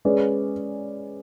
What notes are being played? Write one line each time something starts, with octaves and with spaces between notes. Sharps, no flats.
G#3 C#4 G#4 B4 D5